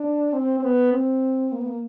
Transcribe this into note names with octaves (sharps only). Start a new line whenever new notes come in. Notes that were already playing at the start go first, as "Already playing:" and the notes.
Already playing: D4
C4
C4
B3
C4
A#3
B3
A#3